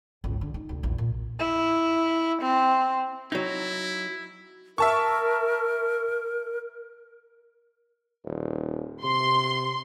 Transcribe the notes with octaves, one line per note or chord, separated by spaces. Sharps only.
G#1 C#2
D3
D#4
D2 C3
A#1 E2
A#2
E4
C4
F#3 D#4 E4
A#4 E5 A5 C#6
D#1
C3 C6